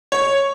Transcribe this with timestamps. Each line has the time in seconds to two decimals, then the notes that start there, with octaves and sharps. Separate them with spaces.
0.12 C#5